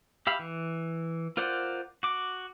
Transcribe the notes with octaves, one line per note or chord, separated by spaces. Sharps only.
G4 E5 F5 B5
E3
F4 A#4 C5 D5 F#5
F#4 D6